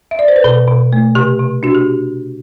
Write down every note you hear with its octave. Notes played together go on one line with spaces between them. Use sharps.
E5
D5
C5
B4
B2 A4
B2
A3
C3 G4
C3
D4 F#4
G4